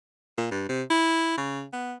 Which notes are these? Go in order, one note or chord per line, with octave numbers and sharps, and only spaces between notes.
A#2
G2
C3
E4
C#3
B3